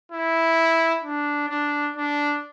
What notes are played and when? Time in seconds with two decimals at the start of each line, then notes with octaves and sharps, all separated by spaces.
0.12 E4
1.04 D4
1.49 D4
1.96 D4